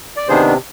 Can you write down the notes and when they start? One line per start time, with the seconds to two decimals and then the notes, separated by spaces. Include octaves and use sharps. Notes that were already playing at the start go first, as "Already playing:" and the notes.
0.17 D5
0.28 C3 D#3 B3 D4 G#4 C5